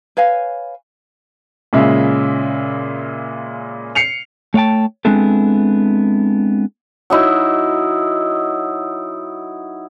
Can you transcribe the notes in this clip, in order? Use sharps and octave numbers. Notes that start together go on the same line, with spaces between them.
B4 C#5 F5 G#5
A#2 C#3 G#3 E5
C7 C#7 F7
A3 C#5 F5 G5 A5
G#3 B3 C4 D4 E4 A4
F#3 D#4 E4